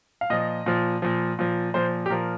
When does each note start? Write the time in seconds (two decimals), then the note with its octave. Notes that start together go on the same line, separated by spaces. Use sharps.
0.21 F5
0.30 A#2 F3 D#5
0.66 A#2 F3
1.02 A#2 F3
1.39 A#2 F3
1.74 A#2 F3 C5
2.06 G4
2.10 A#2 F3 A#4